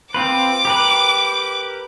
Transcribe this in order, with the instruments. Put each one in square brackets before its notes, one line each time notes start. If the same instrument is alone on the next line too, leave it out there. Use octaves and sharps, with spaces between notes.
[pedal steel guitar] C4 F4 B4 [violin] D6
[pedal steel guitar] G4 A#4 B4